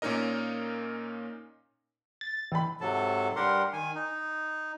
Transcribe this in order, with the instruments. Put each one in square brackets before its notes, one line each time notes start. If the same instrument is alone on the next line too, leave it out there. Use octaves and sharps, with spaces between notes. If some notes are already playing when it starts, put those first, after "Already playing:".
[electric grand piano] A#2 A#3 C#4 D#4 A#4 D#5
[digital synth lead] A6
[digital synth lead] E3 [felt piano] G5 B5
[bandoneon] G#2 C3 F#3 A4 A5
G2 G3 G4 A#4 F#5 C6
D#3 G#5
D#4